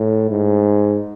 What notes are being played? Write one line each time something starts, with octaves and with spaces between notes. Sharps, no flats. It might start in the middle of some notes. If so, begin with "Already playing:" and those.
Already playing: A2
G#2